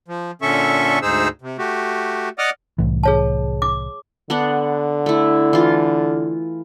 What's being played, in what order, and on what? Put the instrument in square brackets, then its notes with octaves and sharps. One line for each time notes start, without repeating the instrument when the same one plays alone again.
[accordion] F3
A#2 D3 C#4 A4 E5 C#6
D2 G#2 D#4 G#4 C5 E6
C3
A3 F#4 G4
D5 D#5 F#5 D6 D#6 F6
[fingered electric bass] C2 A2 E3
[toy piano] G#4 C#5 A5
D6
[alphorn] D3 [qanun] B3 D4 F#5
[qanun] A3 E4
E3 F4